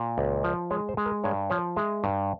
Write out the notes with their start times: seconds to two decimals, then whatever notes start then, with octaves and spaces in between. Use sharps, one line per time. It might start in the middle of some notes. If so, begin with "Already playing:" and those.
Already playing: A#2
0.18 C#2
0.44 F3
0.71 G#3 C#5
0.89 C5
0.97 G#3
1.06 A#4
1.24 G2 C#5
1.50 F3 C#5
1.76 G#3 E5
2.04 G2